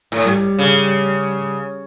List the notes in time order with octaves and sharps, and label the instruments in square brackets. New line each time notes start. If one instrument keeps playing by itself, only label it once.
[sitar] A2
[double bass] G3
[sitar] C#3